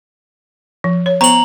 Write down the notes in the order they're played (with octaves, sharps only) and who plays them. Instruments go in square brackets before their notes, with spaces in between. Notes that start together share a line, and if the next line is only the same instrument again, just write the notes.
[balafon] F3
C#5
[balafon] B3 C5 C#6 [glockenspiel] A#5 F#7